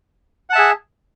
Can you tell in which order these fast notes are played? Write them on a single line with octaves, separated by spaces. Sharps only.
F#5 A5 E5 G#4